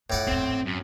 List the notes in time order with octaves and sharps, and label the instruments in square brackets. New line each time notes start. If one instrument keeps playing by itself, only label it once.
[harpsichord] A2 D5 F#5 [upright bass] D4 F4
[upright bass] G#1 E2 [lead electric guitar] C4
[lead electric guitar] F#2